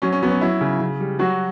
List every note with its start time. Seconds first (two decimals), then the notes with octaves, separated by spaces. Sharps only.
0.02 F#3 C#4
0.12 C#4
0.22 F#3 B3
0.31 C#4
0.41 F#3 E4
0.61 C#3
0.80 C#3
1.00 G3
1.19 F#3 F#4